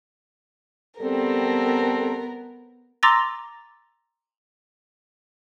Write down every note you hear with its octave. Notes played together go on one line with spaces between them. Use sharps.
G3 B3 C4 A4 A#4
A#5 C6 D6 E6 A6 A#6